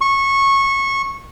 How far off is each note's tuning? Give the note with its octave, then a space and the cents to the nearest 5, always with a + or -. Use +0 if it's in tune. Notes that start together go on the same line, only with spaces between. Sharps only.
C#6 -20